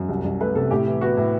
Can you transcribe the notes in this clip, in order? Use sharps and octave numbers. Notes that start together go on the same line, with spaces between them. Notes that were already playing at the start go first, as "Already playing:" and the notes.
Already playing: F#2
C2
C2
A3 B4
C3 A4
A2 G4
E3
B3 F#4
A2 E4